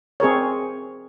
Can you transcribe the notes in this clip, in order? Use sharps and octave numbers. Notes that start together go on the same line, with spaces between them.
C4 G#4 A#4 C#5